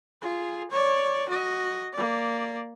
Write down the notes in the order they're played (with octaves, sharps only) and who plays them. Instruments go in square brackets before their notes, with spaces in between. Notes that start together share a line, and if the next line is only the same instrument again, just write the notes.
[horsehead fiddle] F4 G#4
C#5 D5
F#4 D#5
A#3 D5